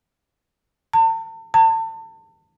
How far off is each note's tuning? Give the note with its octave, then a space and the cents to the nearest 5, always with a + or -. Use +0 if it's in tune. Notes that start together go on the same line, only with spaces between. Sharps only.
A5 +40
A5 +35